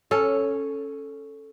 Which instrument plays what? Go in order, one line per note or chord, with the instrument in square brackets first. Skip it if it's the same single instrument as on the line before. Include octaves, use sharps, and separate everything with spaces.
[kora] C#4 A4